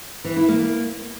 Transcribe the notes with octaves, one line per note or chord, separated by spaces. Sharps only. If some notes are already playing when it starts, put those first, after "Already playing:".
E3
E4
A#3